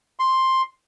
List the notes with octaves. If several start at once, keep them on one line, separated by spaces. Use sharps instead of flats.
C6